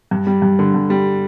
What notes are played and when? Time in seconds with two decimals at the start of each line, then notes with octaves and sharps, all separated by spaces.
0.11 G2
0.27 G3
0.42 G2
0.59 D3
0.74 G2
0.90 G3